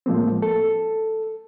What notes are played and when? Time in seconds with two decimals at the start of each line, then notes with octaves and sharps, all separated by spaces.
0.06 A2 F3 G#3 A#3 C4
0.42 A4